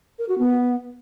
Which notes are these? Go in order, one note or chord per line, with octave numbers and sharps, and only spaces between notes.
A#4
F#4
B3